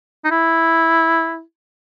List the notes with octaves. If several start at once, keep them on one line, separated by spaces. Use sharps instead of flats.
D#4
E4